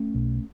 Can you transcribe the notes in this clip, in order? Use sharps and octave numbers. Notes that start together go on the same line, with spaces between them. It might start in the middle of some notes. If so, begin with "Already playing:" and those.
Already playing: A3 C#4
B1 B2